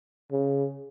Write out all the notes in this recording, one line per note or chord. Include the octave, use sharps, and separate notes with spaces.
C#3